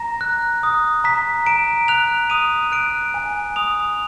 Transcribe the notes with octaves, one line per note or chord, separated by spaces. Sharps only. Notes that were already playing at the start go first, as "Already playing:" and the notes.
Already playing: A#5 A#6
F#6
D#6
A#5 B6
A#5 D7
F#6 F7
D#6 D#7
F#6 D7
G#5
D#6 F7